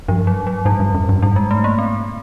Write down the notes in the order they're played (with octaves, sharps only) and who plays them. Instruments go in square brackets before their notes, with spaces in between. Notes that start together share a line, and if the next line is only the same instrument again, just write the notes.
[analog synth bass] G2 [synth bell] F3
[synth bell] F#3
F#3
[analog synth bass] G#2 [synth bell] G3
[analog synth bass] G2
F#2
G2
[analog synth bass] G#2 [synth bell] G3
[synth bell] G#3
A3
A#3
C4